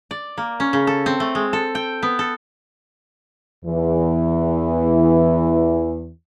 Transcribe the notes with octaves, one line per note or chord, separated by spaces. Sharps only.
D5
A#3
C#4
C#3
A4
C4
A3
G#3
A4
G5
B3
A4
E2 E3